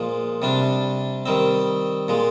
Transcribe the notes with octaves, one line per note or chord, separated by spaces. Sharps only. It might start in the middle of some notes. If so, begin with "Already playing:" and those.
Already playing: A#2 F3 G#3
C3 G3 D4
D#3 G3 C4
A#2 G#3